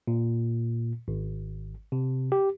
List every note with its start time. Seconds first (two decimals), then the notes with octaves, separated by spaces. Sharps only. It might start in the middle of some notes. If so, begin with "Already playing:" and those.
0.07 A#2
1.08 G#1
1.92 C3
2.32 G4